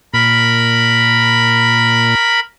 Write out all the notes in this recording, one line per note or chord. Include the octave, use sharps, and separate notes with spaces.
A#2 A#4 B5